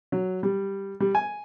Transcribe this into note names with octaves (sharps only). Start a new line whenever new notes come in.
F#3
G3
G3
G#5